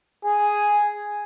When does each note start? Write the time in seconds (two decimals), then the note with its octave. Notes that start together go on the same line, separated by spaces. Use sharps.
0.25 G#4